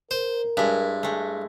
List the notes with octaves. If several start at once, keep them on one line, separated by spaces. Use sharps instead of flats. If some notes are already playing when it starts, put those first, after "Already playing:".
A#4 C5
G2 G#3 E4
G#3 A3